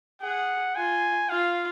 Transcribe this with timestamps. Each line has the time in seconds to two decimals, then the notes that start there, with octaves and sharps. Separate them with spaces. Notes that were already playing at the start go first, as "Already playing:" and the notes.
0.22 G#4 F#5
0.75 F4 G#5
1.29 F4 F5